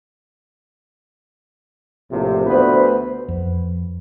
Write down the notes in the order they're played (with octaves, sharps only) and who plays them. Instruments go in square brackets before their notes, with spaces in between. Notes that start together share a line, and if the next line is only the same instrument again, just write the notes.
[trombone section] A#1 A2 C3 F3
D2 B3 B4 C5
[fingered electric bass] F2